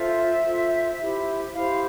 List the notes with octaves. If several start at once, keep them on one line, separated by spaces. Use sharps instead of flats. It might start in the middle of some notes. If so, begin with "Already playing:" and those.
Already playing: F4 A4 C5 E5
F4 A4 C5
E4 G4 C5
E4 G4 C5 F5